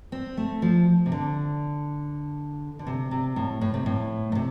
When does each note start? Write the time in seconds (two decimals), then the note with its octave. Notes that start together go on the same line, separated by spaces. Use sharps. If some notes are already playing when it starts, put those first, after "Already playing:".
0.12 C4
0.37 A3
0.62 F3
1.06 C3
1.12 D3
2.79 D3
2.87 C3
3.11 C3
3.36 A2
3.61 A2
3.74 C3
3.86 A2
4.32 A2
4.35 C3